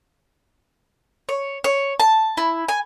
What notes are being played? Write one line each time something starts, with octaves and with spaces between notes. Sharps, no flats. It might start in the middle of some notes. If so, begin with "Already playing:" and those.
C#5
C#5
A5
E4
G#5